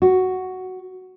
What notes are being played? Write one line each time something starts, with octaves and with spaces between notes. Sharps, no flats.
F#4